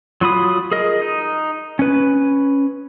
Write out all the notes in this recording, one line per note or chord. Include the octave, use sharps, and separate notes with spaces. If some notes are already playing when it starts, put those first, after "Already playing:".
F#3 F4 B5 D#6
G#4 A#4 D#5
D#4
C#4 B4